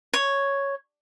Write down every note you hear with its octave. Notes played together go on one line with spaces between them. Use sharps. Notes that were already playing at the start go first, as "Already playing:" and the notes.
C#5